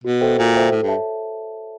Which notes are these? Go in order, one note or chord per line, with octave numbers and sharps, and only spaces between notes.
B2 F#4
A4 C5 E5 G5
A#2 F#4
A4 C5 E5 G5
A2 A4
G2
C#5 E5 A5